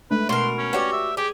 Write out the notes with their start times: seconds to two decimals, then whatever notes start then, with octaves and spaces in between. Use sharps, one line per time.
0.11 G#3 A3 D4 B4
0.29 B2 A#4 C6
0.58 C#4
0.73 F#4 G4 B4 C#5 D5
0.93 E5
1.17 G4 G#4